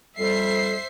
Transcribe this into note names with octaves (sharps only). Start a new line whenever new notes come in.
F2 G3 A4 C5 E5 C7